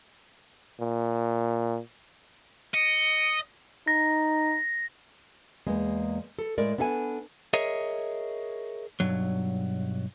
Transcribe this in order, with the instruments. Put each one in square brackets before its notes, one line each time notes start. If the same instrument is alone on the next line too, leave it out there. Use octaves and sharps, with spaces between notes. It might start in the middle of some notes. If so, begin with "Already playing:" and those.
[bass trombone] A#2
[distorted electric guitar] D#5 [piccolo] C#7
[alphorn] D#4 [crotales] A#6
[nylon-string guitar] E2 G#3 A#3
A4
A2 G#3 A#4 D5
B3 D4 A4 F5 G#5
[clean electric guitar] G#4 A#4 C#5 D#5 E5
B1 G2 F#3